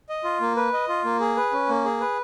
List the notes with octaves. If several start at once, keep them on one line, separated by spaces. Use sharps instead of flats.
D#5
F4
A#3
B4
D#5
F4
A#3
G#4
B4
C#4
A#3
G#4
B4